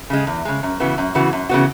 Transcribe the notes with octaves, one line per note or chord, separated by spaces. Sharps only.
C#3 G#3
E2
C#3 G#3
F#2
C#3 E3 B3 F#4
F#2
C#3 E3 B3 F#4
F#2
C#3 E3 B3 F#4